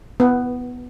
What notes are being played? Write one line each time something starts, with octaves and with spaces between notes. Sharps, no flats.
B3